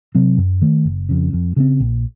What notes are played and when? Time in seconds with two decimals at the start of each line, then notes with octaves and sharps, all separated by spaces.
0.15 C3 F#3 C4
0.38 F#2
0.62 D#3 A3
0.85 F#1
1.09 F2 C#3
1.33 F2
1.56 C#3 F3 C4
1.80 A#1